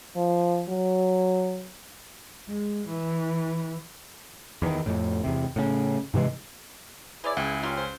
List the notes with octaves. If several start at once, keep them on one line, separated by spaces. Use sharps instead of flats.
F3
F#3
G#3
E3
E2 D#3
F2 A2
E2 C3
A2 C#3
G#2 C3 E3 G#3
E4 G#4 B4 C#5 D5
C#2 F#5 G5
G3 A#3 C#4 F4
C5